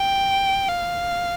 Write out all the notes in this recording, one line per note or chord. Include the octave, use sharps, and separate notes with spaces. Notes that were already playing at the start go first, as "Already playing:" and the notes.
Already playing: G5
F5